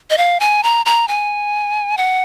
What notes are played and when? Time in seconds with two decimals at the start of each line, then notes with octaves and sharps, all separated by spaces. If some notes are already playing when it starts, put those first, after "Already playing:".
0.10 D#5
0.18 F5
0.40 G#5
0.63 A#5
0.86 A#5
1.08 G#5
1.97 F#5